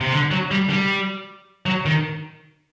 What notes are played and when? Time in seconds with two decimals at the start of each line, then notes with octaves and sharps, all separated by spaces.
0.01 C3
0.13 D3
0.31 F#3
0.51 G3
0.70 G3
1.66 F#3
1.85 D#3